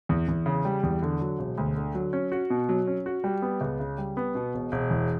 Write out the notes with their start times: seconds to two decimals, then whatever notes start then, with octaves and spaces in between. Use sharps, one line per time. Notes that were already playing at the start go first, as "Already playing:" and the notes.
0.09 E2
0.28 E2
0.46 C#3
0.65 G3
0.83 E2
1.02 D3
1.21 F#3
1.39 E1
1.58 D2
1.76 D3
1.95 F#3
2.13 C#4
2.32 F#4
2.50 B2
2.69 F#3
2.87 C#4
3.06 F#4
3.24 G3
3.42 B3
3.61 C#2
3.80 C#3
3.98 G3
4.17 B3
4.35 B2
4.54 E1
4.72 E1
4.90 E2